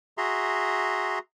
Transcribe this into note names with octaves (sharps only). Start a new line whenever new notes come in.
F#4 G#4 E5 A#5 C6